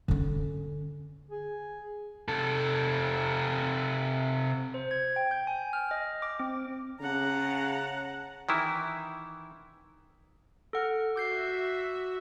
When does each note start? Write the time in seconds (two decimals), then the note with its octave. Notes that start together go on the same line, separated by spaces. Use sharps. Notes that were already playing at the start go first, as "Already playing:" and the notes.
0.08 D3 C#4
1.31 G#4
2.28 C3 A4
4.74 C5
4.91 G#6
5.16 G5
5.31 G6
5.47 G#5
5.73 F6
5.91 D#5
6.22 D6
6.40 C4
7.01 C#3 F#5 A5 A#5
8.49 D#3 E3 E4
10.73 A4 F#5 F6
11.16 F#4 E5 D6 G6 C7